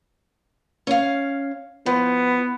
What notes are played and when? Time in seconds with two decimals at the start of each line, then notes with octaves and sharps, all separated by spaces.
0.87 C#4 F5
1.86 F3 B3